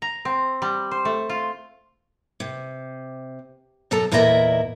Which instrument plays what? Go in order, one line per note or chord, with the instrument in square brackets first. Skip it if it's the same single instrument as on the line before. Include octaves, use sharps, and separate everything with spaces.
[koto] A#5
C4
G3
C5
A3
F4
[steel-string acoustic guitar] C3
F#2 B2 A4 A5 A#5
E2 A#2 E4 A#4 D#5 E5